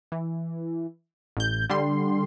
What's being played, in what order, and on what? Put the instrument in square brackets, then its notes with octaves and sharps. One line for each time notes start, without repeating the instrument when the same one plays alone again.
[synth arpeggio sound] E3
A1 G6
D3 G3 C6